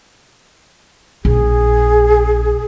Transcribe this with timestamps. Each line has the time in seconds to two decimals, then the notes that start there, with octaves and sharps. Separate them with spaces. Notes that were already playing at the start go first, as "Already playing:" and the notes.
1.25 A#1 G#4